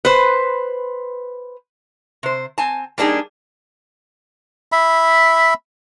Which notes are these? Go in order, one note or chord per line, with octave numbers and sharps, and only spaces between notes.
B4 C5
C3 C5
C4 G#5 A5
G3 A#3 D4 D#4 G#4
E5 B5